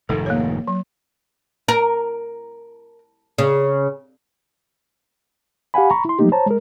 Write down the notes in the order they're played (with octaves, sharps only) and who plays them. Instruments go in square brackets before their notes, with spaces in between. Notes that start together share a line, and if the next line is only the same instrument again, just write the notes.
[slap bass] F1 G#2 D#3 [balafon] A4
[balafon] A#3 C#5
F#3
[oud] A#4
C#3
[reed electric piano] G4 F5 F#5 G#5 B5
A#5 B5 C#6
E4 C6
F3 F#3 A3 A#3 D#4 G4
C5 C#5 A5 A#5
G#3 A#4